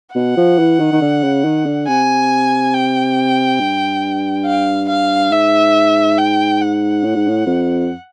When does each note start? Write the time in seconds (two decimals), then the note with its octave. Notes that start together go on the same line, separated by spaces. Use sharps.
0.15 B2 F#5
0.37 F3
0.59 E3
0.80 D#3
0.92 D#3
1.01 D3
1.23 C#3
1.45 D#3
1.66 D3
1.88 C3 G#5
2.74 G5
3.60 G2
4.46 F5
4.89 F5
5.32 G#2 E5
6.18 G5
6.61 F#5
7.04 A2
7.15 G#2
7.28 A2
7.46 F2